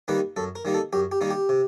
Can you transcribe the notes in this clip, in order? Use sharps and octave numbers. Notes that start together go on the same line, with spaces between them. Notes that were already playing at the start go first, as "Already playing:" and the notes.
D#3 G3 A#3 D#4 B4
F#2 A4
A#4
D#3 G3 A#3 D#4
A4
F#2 G4
G4
D#3 G3 A#3 D#4
G4
C3